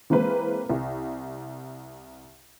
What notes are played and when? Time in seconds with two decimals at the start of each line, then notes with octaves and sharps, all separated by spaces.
0.10 E3 G#3 A#3 C4 B4
0.69 C2